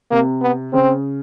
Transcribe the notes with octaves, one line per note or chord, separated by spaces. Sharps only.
C3 A#3
B3
C#3 C4